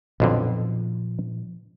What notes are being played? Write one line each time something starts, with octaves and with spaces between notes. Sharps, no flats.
B1 F2 A#2 D3 F3